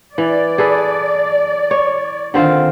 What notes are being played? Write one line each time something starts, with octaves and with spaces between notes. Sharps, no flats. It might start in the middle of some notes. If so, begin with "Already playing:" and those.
E3 D5
G#4 A4 B4
C#5
D3 D#3 C4 F4